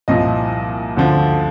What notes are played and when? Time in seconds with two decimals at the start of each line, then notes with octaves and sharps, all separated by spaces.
0.08 C2 A#2 F3 D#5
0.97 D2 D3 F3